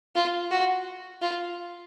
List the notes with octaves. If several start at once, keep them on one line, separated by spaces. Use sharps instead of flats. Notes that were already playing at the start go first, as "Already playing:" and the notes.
F4
F#4
F4